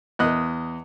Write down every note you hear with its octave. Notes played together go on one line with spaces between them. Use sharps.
E2 D#5 F#6